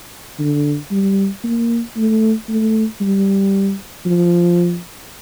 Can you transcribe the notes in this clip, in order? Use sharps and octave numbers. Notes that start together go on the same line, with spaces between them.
D3
G3
A#3
A3
A3
G3
F3